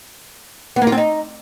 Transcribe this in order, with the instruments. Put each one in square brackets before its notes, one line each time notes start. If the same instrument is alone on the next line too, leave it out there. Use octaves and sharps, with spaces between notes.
[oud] B3
A#3
F4
C4
D#4